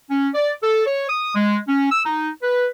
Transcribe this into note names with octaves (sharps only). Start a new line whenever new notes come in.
C#4
D5
A4
C#5
D#6
G#3
C#4
E6
D#4
B4